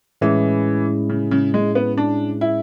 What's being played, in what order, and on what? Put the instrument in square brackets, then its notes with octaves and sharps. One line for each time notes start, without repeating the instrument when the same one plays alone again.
[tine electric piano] A2 G#3 C#4 E4 G#4 [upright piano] E3
[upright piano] C#3
C#3
G#3
B3
D4
E4